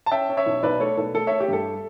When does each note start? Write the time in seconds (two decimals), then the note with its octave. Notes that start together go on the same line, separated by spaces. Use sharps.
0.06 A5
0.11 C#4 E5 G5
0.29 C#4
0.37 C#5 E5
0.46 B1
0.63 B1 B4 D5
0.80 A3 A4 C#5
0.97 B1 A4
1.14 A3 A4
1.27 A3 C#5 E5
1.40 G4
1.48 G2 A4